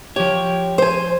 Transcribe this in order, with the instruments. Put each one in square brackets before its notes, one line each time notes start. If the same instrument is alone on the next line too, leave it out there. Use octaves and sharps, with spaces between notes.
[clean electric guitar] F3 C#5 [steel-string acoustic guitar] G4
[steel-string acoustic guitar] C5 G#5